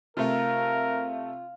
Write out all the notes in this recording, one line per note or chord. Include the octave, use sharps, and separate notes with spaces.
C3 A3 F4 A#4